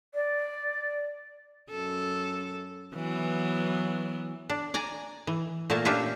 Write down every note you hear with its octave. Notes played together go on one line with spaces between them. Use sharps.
D5
F#2 A4
E3 F#3 B3
D4
D5 G#5 A#5
E3
A#2 A3 A#3 A#4 A5
C#4 D4 F4 G4 E5